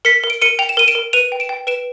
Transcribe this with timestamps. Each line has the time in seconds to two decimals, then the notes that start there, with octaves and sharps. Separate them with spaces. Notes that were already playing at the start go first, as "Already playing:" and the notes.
0.05 A#4 B6 C#7
0.24 A#4
0.30 D7
0.41 A#4 C#7 D#7
0.59 G5 F7
0.69 E7
0.77 A#4 D#7
0.88 D7 E7
0.95 A#4
1.13 B4 D#7 F7
1.32 G5
1.40 D7 E7
1.49 G5
1.67 B4 D7 E7